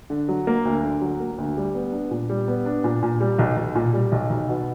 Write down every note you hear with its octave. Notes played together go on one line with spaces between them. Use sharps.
D3
F#3
A#3
D2
D3
F#3
A#3
D2
G3
B3
D4
A#2
G3
B3
D4
A#2
A#2
G3
B1
B1
A#2
G3
B1
B1
B2